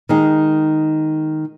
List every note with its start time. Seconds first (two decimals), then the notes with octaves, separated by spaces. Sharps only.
0.09 D#3 G#3 D#4 G#4